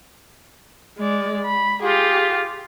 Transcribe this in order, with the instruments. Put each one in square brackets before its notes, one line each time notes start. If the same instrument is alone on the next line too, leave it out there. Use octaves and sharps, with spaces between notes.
[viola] G#3 D5
B5
[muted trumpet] F4 [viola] G4 G#4